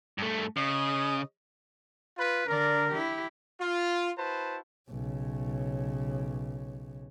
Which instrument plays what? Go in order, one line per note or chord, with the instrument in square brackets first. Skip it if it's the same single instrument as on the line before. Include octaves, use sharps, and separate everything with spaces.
[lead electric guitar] G2 A3
[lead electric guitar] C#3 [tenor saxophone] D#5
[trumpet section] F4 B4
[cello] D3 D5 [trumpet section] A#4
[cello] E4 G4
[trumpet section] F4
E4 F#4 B4 C5 A5
[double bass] B1 C#3